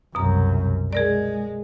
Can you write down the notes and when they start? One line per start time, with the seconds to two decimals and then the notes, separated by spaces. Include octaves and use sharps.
0.15 C2 F#2 B2 A#5
0.93 G#3 G#4 A#4 D5